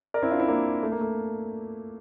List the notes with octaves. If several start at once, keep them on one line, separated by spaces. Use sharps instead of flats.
A#4 D5
C4 E4
D4 F4
C4 E4
A#3 D4
A3
A#3
A3